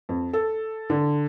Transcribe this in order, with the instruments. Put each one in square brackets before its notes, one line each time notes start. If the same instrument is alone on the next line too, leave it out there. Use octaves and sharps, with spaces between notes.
[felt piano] F2
A4
D3